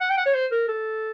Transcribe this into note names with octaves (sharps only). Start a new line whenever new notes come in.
F#5
G5
F#5
C#5
C5
A#4
A4